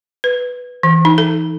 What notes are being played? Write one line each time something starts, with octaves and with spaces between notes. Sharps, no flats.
B4
E3
D#4
A4